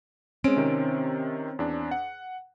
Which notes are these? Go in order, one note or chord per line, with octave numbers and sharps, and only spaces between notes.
G#3 C4 C#4 D7
C3 D#3
E2 D4
F#5